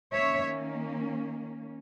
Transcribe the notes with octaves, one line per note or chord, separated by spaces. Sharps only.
D#3 A#3 C#4 C#5 E5